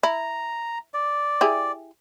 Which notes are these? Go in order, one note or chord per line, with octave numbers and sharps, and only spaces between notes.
E4 A#5
D5
E4 G4 G#4